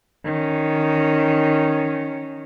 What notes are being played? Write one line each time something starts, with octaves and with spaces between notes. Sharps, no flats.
D#3 C#4